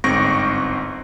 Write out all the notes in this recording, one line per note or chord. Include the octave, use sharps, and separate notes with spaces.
G1 G#2 C4 C#6 A#6 D7